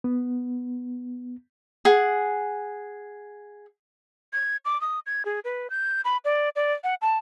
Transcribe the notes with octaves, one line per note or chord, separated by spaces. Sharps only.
B3
G#4 F#5
G#6
D6
D#6
G#6
G#4
B4
G6
B5
D5
D5
F#5
A5